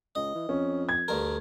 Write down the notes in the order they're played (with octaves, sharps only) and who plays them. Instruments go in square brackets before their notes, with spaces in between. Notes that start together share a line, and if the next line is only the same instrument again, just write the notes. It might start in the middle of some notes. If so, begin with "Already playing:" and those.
[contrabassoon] C#2 [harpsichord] D#5
[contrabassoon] E3
[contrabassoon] F2 [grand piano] C#4
[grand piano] G#6
[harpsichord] D2 G2 A#4